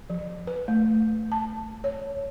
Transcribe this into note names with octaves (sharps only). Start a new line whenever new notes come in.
F3
B4
A3
A5
C#5